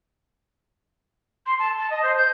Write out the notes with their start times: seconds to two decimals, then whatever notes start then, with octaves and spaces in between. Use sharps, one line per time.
1.46 C6
1.59 A5
1.78 A5
1.90 D#5
2.03 C5
2.17 G6